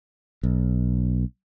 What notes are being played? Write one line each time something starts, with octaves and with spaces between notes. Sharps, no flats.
B1